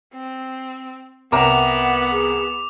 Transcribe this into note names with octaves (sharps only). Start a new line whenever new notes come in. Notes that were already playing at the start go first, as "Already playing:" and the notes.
C4
C2 B3 A#4 F#5 A#5 D6 E7 F7
G#4